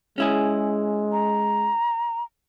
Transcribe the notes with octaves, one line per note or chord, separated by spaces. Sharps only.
G#3 C#4 E4 G#4
A#5